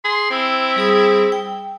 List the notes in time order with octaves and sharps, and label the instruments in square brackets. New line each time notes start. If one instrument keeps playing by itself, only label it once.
[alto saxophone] G#4 [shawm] C6
[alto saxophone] C4 [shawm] E4
[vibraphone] G3 G#4 D#6
G5